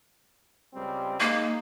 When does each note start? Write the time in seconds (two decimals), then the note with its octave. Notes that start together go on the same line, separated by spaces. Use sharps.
0.74 C#2 G3 C4
1.20 G#3 A#3 D#4